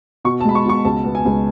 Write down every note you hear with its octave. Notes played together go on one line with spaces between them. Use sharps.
B2 C#6
A5
G#3 B5
C#6
B2 C#6
C#2 A5
B3
G#5
C#2